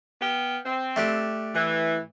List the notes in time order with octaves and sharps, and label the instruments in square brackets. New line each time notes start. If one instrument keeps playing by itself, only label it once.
[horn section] B3 F5 G5
C4
[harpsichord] A3 D4 G4
[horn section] E3